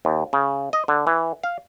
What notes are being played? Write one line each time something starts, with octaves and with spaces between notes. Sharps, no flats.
D#2
C#3
D#5
D3
E3
F5